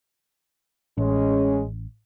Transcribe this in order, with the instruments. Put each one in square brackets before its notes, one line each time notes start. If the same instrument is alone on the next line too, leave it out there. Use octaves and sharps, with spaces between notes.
[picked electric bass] A1 [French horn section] G#3 C#4